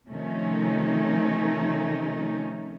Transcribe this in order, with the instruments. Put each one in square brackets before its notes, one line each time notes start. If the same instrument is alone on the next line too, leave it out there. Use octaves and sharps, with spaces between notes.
[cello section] C3 D#3 F3 A3 C#4 D#4